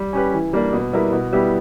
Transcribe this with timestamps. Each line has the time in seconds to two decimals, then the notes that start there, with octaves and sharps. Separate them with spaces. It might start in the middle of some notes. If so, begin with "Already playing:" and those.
Already playing: G3
0.13 C#4 G4 B4
0.33 E3
0.53 G3 A#3 D4
0.73 B2
0.93 G3 B3 E4 A#4
1.13 B2
1.33 G3 B3 E4 G4